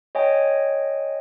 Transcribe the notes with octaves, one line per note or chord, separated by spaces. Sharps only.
C#5 D#5 G5 G#5